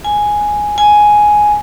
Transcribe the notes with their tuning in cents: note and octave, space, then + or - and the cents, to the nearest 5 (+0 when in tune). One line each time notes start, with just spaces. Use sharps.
G#5 +0
G#5 +5